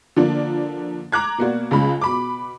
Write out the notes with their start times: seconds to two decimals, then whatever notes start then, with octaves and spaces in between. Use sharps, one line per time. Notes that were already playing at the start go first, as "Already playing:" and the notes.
0.16 D3 F3 A#3 D4
1.12 A#5 D6 F#6 G#6
1.38 B2 A#3 F#4 D5
1.71 C#2 C#3 B5
2.01 B2 B5 D6